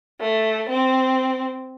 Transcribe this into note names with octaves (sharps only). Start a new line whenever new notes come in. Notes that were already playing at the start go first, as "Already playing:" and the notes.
A3
C4